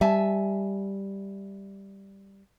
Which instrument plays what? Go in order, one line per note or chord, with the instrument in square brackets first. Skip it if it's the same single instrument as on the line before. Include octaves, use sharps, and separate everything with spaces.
[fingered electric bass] G3 [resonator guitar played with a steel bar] E5 G#5 A5